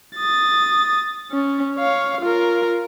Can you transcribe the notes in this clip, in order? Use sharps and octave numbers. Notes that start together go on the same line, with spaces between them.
D#6 A6
C#4
C#5 F5
F4 A#4